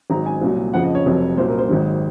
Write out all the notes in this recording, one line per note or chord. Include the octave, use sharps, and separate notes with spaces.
G#1 G#2 F#3 A#5
G#5
C2 A#2 F#3
F2 C#3 F3 F#5
D#5
C#5
F1 F2 C3 F#3
C2 A#2 F#3 C5
A#4
C5
G#1 G#2 D#3 F#3